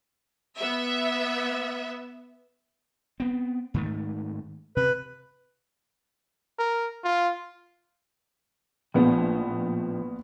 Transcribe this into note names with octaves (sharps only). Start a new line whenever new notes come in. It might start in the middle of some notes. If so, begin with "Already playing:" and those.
B3 E5
B3 C4
G#2 D#3 A3
C3 B4
A#4
F4
A#1 A2 F3 B3